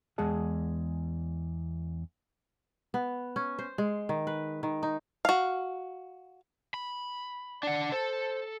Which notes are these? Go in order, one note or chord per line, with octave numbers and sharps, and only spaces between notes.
E2 G#3 G#4 F#5 A5
B3
C#4
C5
G#3
D#3
B4
D#3
D#4
F#4 F5
B5
D4 D5 F#5
A4 C5